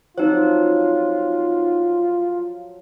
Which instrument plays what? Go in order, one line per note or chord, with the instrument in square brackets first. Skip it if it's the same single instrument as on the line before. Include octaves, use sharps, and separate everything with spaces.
[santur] F3 F#3 [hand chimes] C4 D#4 C5 [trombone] F4